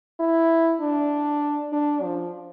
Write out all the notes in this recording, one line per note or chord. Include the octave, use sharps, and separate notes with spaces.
E4
D4
D4
F3